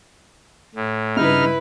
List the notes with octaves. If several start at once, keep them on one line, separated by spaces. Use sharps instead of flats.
A2
G2 C#3 D#4 E4 B4 F6